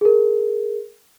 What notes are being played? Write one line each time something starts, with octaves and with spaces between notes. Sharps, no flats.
G#4 A#4